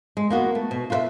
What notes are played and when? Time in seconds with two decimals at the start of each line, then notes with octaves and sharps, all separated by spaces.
0.17 G#3
0.30 A#3 B3 F#4
0.55 A3
0.71 B2
0.90 F4 B4 E5